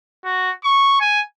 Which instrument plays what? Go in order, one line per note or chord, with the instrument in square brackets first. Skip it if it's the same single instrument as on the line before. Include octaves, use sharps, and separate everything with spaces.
[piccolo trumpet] F#4
C#6
G#5